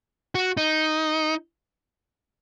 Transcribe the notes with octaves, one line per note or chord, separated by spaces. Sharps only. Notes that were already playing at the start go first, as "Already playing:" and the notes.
F#4
D#4